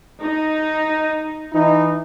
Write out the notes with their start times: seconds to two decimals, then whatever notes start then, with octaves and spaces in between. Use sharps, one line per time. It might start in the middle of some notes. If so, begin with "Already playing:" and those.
0.21 D#4
1.53 E3 D#4